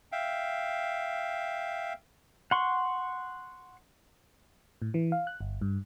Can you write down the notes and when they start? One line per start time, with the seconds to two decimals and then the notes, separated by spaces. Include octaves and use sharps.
0.12 E5 F5 G5
2.51 F#5 C6 C#6
4.82 A2
4.94 E3
5.12 F5
5.27 F#6
5.41 G1
5.61 G2